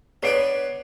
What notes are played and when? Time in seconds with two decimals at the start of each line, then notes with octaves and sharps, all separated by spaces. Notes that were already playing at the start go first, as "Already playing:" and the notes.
0.23 B3 D4 B4 C#5 C7 D7